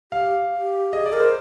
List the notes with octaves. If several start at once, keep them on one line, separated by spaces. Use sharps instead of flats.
G4 F5
G4
G#4 D#5
D5
A#4
C5